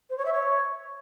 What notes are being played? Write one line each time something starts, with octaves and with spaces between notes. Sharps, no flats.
C5
C#5
E5
C#5